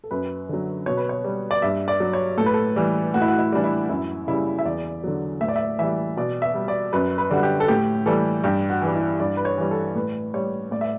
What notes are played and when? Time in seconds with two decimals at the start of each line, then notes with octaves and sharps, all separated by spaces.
0.04 A4
0.11 F#2 B4
0.49 D3 F#3
0.86 B2 C#5
0.97 B4
1.09 C#5
1.24 G3
1.51 D5
1.62 G2 E5
1.88 D5
2.00 F#3
2.13 C#5
2.38 A2 A4
2.46 B4
2.54 A4
2.76 E3 G3
3.14 A2 F#4
3.22 E4
3.28 F#4
3.39 E4
3.52 E3 G3 D4
3.64 E4
3.89 F#2 E4
4.27 C#3 G3 E4
4.59 E5
4.65 E2 D5
5.04 D3 F#3
5.41 A2 E5
5.48 D5
5.56 E5
5.79 E3 G3 E5
6.17 B2 D5
6.42 E5
6.54 G3
6.68 D5
6.93 F#2 B4
7.18 B4
7.31 D3 G3 F#4
7.43 G4
7.60 A4
7.68 A2 G4
8.06 E3 G3 A4
8.44 G2 G4
8.70 F#4
8.82 E3 G3
8.95 E4
9.20 G2 D5
9.37 B4
9.45 C#5
9.58 E3 G3
9.71 A4
9.95 A2 B4
10.34 G3 C#5
10.71 A2 D5
10.81 E5